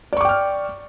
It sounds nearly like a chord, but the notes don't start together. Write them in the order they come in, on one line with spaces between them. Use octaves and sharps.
D5 C#6 D6 G5 F6